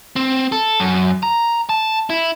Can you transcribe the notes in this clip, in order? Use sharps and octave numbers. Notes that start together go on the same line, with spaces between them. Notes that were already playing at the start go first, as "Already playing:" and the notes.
C4
A4
F#2
A#5
A5
E4